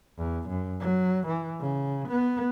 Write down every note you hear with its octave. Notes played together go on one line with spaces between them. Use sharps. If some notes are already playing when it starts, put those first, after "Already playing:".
E2
F#2
F#3
E3
C#3
B3